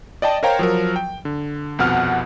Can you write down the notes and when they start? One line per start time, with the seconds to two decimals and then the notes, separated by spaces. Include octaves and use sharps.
0.22 D5 D#5 G5 A5
0.43 A#4 C5 C#5 F5 G5 A#5
0.59 F3 F#3 A#4
0.96 G5
1.25 D3
1.79 C2 F2 B2 F#5 F6